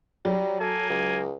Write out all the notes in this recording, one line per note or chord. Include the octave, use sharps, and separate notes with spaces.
F#3 G3
A#3 A4 G#5
C#2